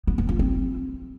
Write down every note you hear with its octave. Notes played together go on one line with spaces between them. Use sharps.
B3
B3
F4
C4